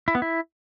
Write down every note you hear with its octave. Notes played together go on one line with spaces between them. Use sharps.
E4
B3
E4